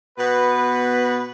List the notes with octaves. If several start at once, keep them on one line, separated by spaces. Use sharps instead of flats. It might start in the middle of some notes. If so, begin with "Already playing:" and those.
B2 B3 B4